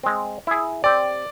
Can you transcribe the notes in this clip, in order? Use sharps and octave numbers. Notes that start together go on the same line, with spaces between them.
G#3 C4
E4 G#4
C4 G4 D5